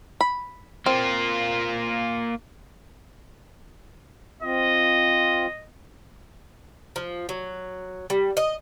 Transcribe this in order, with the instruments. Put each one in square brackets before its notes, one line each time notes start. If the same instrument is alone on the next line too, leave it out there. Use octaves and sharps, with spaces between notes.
[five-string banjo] B5
[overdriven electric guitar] A#3 F4 [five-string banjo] C4
[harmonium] C4 F4 [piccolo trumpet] D#5
[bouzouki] F3
F#3
G3
D#5